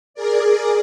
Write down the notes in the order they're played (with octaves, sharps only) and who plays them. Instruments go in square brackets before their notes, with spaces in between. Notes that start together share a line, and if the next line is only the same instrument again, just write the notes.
[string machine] G#4 A#4 D5